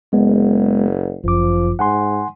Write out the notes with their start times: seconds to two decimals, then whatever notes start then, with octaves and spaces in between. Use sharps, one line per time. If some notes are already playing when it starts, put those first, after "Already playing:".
0.13 F#1 G#3 B3
1.24 G1 F#2 F3 D6
1.79 G#2 F#5 G#5 C6